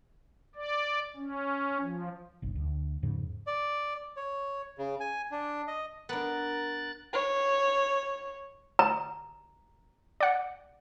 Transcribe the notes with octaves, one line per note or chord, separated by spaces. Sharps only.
D5
C#4
F3
F#1 B1
D2
E2 G#2 C#3 F3
D5
C#5
C#3
G#5
D4
D#5
B3 D4 A#4 F#6 A6
C#5
A#5
D5 F#5